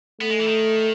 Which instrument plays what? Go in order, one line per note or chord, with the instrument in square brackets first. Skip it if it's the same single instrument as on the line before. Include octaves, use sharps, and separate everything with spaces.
[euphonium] A3 [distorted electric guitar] B3
[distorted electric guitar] G#3
E3
D#3